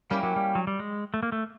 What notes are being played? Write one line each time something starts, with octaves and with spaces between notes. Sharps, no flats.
G3 A#3 C#4 E4 G4
F#3
G3
F#3
G3
G#3
A3
A#3
A3